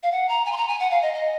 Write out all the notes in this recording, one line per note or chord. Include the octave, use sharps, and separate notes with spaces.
F5
F#5
A#5
G#5
C6
A#5
G#5
F#5
F5
D#5
D#5